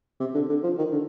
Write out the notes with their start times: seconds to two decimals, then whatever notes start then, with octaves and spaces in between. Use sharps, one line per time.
0.20 C3
0.35 D3
0.49 D3
0.64 F3
0.78 D#3
0.92 D3